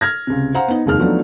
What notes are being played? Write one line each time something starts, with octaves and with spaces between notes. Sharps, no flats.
F6 G#6 A#6
C#2 C3
C5 F5 F#5 A#5
B3 D#4
F1 D#2 G#3 F6
F3 F#3 A3 B3 D4 D#4